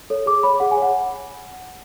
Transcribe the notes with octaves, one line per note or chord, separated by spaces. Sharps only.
A4 C#5
G#4 D6
C#5 B5
G#4 F#5
G#5
C#5 F#5